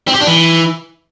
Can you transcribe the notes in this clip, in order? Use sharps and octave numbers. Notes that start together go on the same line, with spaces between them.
C4
G4
D4
E3